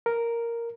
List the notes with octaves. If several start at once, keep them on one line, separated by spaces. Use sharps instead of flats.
A#4